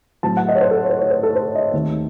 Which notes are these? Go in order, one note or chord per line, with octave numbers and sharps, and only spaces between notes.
A2 F#3 C4 A5
F#5
D#5
C#5
C5
A4
C#5
C5
C#5
C5
A4
C5
D#5
D#2 D#3 A3 C4